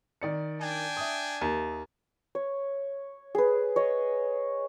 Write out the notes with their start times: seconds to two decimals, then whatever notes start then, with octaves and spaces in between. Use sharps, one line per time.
0.22 D#3 D5 C#7
0.61 D4 G5 G#5
0.97 E5 D#6
1.41 D#2
2.35 C#5
3.35 G#4 B4
3.76 C#5 D#5